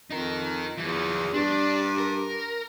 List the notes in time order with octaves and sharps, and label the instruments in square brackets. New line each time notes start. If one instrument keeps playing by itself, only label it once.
[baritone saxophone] F2 [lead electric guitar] D#4 A#4
[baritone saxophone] E2 [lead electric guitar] E3 F3
[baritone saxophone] G2 [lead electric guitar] D4
[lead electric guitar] A#4